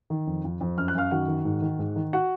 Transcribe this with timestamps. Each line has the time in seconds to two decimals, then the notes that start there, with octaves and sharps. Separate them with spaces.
0.10 D#3
0.27 F2
0.44 F2
0.61 F2
0.77 F#2 F6
0.88 F#6
0.95 F#2 F5 F6
1.11 D#3 F#4 F#5
1.28 D#3
1.45 G#2
1.62 D#3
1.79 G#2
1.96 D#3
2.13 F#4 F#5